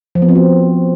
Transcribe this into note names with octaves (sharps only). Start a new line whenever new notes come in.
F3
B3
C4
F#4